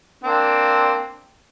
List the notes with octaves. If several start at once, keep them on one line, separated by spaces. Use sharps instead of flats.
A#3 C4 D4